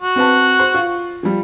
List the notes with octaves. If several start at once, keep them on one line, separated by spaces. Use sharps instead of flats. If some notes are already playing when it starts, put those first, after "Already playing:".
F#4
C4 B4 A5
C5
F4
F3 G3